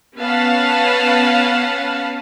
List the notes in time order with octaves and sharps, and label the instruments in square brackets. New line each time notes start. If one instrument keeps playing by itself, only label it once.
[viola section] B3 C#4 B4 F5 F#5 A5